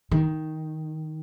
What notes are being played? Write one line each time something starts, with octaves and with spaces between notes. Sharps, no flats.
D#3